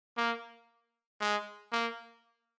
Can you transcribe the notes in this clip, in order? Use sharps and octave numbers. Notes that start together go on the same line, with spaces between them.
A#3
G#3
A#3